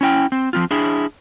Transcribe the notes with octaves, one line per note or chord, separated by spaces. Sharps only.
C#4 E4 G5
C4
F3 C4 F4
D4 E4 G#4